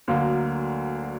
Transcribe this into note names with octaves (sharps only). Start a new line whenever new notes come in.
D2 D3 F#3 A#3 F5